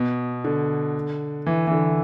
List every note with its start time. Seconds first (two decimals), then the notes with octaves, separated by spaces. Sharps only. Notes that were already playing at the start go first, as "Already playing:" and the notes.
Already playing: B2
0.44 D3
1.46 E3
1.67 E3
1.71 D3